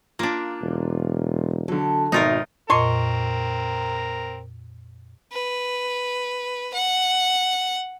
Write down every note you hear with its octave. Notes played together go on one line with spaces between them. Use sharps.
A#3 D4 F4 A#4
E1
D3 F#3 A4
G#1 B2 D#3 D#4 F4 A#4 E5
F2 A#2 C4 A#4 D#5 C6 C#6
B4
F#5